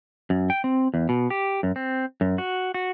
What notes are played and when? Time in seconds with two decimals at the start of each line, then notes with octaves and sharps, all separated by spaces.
0.30 F#2
0.50 G5
0.64 C4
0.94 E2
1.09 B2
1.30 G4
1.63 F#2
1.76 C4
2.21 F#2
2.38 F#4
2.74 F#4